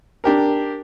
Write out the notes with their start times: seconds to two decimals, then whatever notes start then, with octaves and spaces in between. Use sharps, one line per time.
0.24 D4 G4 A#4